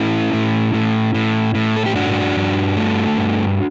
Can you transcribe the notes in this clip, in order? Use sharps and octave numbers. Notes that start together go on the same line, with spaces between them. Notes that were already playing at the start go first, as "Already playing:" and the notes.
Already playing: A2 C#4 E4
A2
A2
A2
A2
A4
G4
G2 D4 F#4
G2
A3
G2